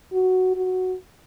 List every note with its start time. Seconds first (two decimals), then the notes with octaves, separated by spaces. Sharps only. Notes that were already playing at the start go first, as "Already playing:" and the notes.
0.13 F#4
0.56 F#4